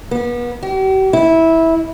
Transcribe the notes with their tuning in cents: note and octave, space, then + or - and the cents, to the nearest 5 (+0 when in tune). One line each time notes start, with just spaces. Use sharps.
B3 -35
G4 -45
E4 -15